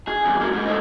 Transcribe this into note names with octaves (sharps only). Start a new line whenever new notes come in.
G#4
E2 G2
F#3 A#3
G#2 G#3
A3 D#4